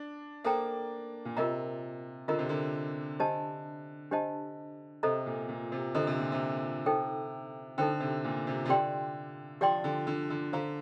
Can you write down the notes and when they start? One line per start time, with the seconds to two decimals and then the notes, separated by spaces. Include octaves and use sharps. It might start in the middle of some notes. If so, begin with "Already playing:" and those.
Already playing: D4
0.44 A#3 A4 C5 G5 A#5
1.25 A#2
1.37 C3 F4 A#4 D#5 A#5
2.28 D3 F4 A#4 D#5 A#5
2.39 C3
2.49 D3
3.20 D4 G4 C5 D#5 A5
4.11 D4 G4 C5 D#5 A5
5.03 C3 A4 C5 D#5 A#5
5.26 A#2
5.49 A#2
5.72 C3
5.95 D3 A4 C5 D#5 A#5
6.07 C3
6.20 A#2
6.32 C3
6.86 D#4 A4 C5 G5
7.78 D3 D#4 A4 C5 G5
8.01 C3
8.24 A#2
8.47 C3
8.66 C3
8.69 D3 G4 D5 G5 C6
9.61 F3 G4 D5 G5 C6
9.84 D3
10.07 D3
10.30 D3
10.53 D3 C5 F5 A#5